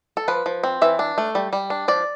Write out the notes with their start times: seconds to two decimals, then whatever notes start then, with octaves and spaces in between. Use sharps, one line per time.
0.17 A4
0.28 F3 B4
0.46 F3
0.63 C4
0.82 E3 E5
0.99 D4
1.18 A3
1.35 G3
1.53 G3
1.70 D4
1.88 F3 D5